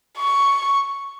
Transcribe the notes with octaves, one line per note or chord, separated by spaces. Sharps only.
C#6